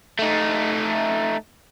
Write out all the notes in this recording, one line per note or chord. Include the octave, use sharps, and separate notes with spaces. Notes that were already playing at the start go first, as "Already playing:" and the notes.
A3 D#4